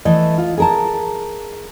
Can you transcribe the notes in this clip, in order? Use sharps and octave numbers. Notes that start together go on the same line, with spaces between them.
E3 A3 D#5
F4
G#4 A#4 A5